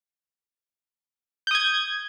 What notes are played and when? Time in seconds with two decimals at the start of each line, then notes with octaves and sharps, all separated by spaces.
1.47 G6
1.51 D#6
1.55 G#6